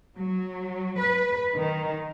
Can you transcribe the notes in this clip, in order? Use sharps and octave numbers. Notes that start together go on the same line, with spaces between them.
F#3
B4
D#3